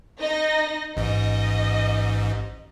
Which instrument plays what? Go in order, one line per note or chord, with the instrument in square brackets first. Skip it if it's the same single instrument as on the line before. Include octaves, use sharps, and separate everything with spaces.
[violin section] D#4 D#5 A#6
[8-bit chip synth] A1 G#2 [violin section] D#5